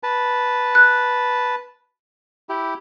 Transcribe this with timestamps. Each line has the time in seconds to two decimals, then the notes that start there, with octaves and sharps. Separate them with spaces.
0.03 B4 A5
0.75 F#6
2.49 E4 G4